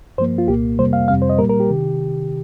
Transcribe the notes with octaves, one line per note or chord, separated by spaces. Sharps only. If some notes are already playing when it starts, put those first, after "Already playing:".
G2 F3 A#3 C5
F4
C2 A#2 A#3 G4
F2 C3 G3 A#3 C5
F5
F2 C3 G3 C4 F5
C5
D#5
A#2 G3 A#3 A#4
A#4
G4
C3 D#3